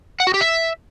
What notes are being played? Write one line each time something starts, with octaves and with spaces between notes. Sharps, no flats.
F#5
F#4
G4
E5